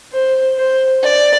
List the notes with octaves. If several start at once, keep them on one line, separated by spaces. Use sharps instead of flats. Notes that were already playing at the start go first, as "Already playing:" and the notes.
C5
C5
D5